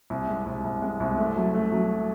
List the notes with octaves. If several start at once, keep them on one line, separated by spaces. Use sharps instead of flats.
C2
G#3
C2
C2
G#3
C2
A3
F#3
A3
F#3